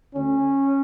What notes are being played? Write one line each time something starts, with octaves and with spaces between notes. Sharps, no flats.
D2 D3 C#4